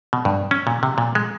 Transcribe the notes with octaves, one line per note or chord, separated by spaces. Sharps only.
B2
G2
C#4
A#2
C3
A#2
G#3